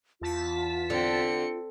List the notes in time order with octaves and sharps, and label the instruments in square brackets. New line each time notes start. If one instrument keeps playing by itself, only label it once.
[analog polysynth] E2 A5 B6 [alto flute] F4
[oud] D3 [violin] C4 C#7